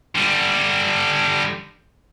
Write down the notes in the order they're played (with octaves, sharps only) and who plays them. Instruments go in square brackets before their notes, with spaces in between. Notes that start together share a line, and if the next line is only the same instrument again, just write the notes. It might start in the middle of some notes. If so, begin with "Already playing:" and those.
[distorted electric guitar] D3 G3